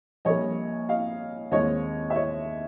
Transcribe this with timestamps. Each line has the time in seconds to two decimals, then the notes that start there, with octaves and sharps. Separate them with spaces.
0.25 A#1 A#2 G3 A#3 C#5 D#5
0.89 D#5 F5
1.51 D#2 D#3 G#3 C4 C#5 D#5
2.10 E5
2.15 C#5 D#5